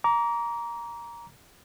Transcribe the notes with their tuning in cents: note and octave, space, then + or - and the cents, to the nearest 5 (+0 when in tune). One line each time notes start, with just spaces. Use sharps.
A#5 +10 D6 -30